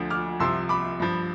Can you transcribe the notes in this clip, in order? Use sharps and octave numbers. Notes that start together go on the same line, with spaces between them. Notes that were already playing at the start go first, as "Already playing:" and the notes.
Already playing: D2 D3 F3
D6 F6
C2 C3 F3 C6 E6
B5 D6
G2 F3